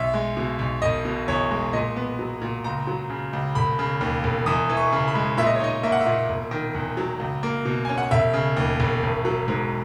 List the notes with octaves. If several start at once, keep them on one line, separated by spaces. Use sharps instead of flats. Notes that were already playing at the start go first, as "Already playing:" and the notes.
Already playing: B1 E5
G#3
B2
B1
E1 D#5
B2
E2 C#5
G#3
A#2 D#5
B3
F#3
A#2
C#2 A#5
F#3
C#3
C#2
E1 B5
C#3
D#2
E1
E2 D#6
E3
C#6
C#3
B5
G#3
A#2 E5
D#5
C#5
D#4 D#5
A#3 E5
F#5
E5
A#2
E1
D#3
E2
F#3
C#2
A#3
B2
C#4 G#5
F#5
E1 E5
C#3
D#2
E1
G#1
F#3
G#2